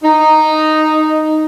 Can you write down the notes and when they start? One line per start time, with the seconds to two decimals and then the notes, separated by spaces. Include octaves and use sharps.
0.03 D#4